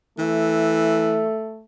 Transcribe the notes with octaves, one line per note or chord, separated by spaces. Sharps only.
E3 A3